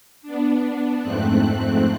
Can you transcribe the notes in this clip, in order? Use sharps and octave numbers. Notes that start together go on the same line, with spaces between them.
B3 D4
F2 G#2 A3 C4 F#6